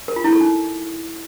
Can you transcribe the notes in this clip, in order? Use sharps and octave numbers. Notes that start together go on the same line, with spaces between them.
A#4
F4
E4
A4
D#4